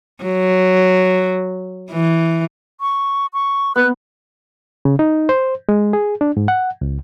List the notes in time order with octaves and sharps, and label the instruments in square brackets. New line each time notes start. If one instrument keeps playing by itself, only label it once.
[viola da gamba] F#3
E3
[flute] C#6
C#6
[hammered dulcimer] B3 [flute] F#6
[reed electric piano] C#3
D#4
C5
G#3
G#4
D4
G#2
F#5
C#2